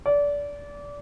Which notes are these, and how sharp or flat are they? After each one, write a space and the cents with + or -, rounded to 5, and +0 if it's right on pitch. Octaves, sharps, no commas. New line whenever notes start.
D5 -25